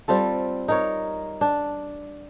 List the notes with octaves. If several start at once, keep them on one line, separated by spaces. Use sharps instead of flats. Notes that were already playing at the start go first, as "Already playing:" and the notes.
G3 C4 F4 A4
D#4 A#4 C#5
D4